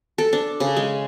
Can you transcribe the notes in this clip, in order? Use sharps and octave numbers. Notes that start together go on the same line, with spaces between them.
A4
D4
C#3
G#3